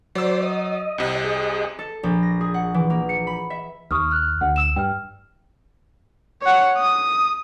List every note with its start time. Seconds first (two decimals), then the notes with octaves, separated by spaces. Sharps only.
0.15 F#3 C5 D5 E6
0.43 D#5
0.98 C2 C3
1.24 G#4 D#5
1.79 A4
2.03 A#1
2.23 A#6
2.41 G#4
2.54 F#5
2.74 E3
2.90 A#3
3.09 C#7
3.27 B5
3.50 E5
3.91 D#2 C#6 D#6 F6
4.11 F6 F#6
4.41 D2 F#5
4.56 E6 E7
4.76 G2 G5 F6
6.42 C#5 F#5
6.77 D#6